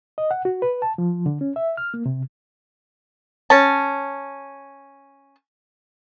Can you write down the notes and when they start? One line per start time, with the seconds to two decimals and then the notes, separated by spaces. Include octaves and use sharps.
0.18 D#5
0.31 F#5
0.45 F#4
0.62 B4
0.82 A5
0.98 F3
1.26 D3
1.41 C#4
1.56 E5
1.77 F6
1.94 A#3
2.06 C3
3.50 C#4 A5